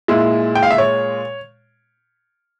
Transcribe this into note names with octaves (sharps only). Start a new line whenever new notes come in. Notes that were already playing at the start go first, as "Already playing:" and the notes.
A#2 G#3 E4
G5
F5
E5
C#5